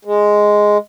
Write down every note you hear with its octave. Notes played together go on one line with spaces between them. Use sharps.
G#3